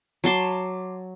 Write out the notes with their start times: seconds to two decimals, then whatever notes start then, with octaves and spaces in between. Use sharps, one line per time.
0.24 F#3 A5 C6 D6